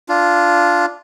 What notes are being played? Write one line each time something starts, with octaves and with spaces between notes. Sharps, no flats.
D4 F4